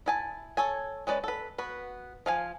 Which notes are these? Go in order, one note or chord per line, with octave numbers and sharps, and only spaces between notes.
E4 G#5 A5
A4 C#5 G#5
G#3 C#4 B4 D5
A4 B4
B3 F#4 B4
F3 F5 G#5